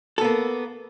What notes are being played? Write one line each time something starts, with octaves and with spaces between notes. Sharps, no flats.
A#3 B3 A4